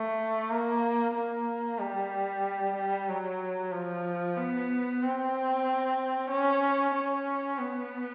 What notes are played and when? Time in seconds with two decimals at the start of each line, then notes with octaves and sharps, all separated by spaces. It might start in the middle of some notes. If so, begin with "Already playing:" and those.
Already playing: A3
0.51 A#3
1.14 A#3
1.79 G3
2.76 G3
3.09 F#3
3.72 F3
4.37 B3
5.02 C4
6.31 C#4
6.95 C#4
7.58 B3